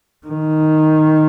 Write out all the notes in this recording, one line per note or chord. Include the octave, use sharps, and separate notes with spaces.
D#3